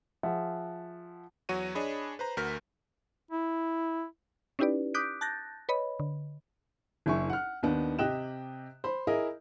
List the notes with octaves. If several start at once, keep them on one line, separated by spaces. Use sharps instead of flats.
F3 G#4 E5 F#5
E2 F#3 F#4 C#5 D#7
D4 G#4 C#5 D#5 B5
B4 C5 A#5
D2 F#4 A#4 F6 G6 B6
E4
C#4 D#4 E4 G4 B4 D5
D6 D#6 F#6 G6 B6 D7
A5 F#6 G6 A6 A#6
B4 C#5 D#5 B5
D3
F#1 D4 E4 G#5 C#6
F#5 F6
D#2 D#3 B3 D4
C3 G4 D#5 G5 F#6 E7
C5 B5
E4 G#4 A#4 D#5